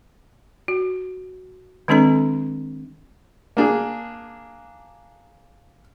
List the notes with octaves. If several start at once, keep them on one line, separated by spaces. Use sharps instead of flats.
F#4
D#3 G#3 C4 D4 A4 A#5
A#3 D4 G#4